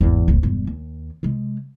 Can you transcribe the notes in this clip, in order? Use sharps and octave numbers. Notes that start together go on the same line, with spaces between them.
G#1 E2
D1 D2
E1 G2
D#2
C3 G#3